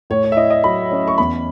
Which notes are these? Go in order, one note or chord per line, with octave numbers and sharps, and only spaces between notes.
A2 C#5
C#5
E5
E4 D#5
D#5
F#3 B5
C#4
C#6
E2 B5